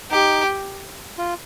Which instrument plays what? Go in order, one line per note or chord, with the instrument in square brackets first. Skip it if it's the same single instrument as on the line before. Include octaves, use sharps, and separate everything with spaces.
[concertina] D#4 [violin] G4
[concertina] F4